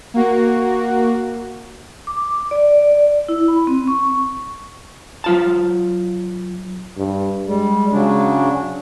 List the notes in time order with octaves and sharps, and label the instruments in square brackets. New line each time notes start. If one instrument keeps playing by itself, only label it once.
[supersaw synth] A#3 F#4
[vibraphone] D6
D5
E4
B5
C4
C#6
[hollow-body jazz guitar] F#3 F4 A5
[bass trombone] G2
[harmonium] G3 [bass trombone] G#3
[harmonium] C#3 F#3 D4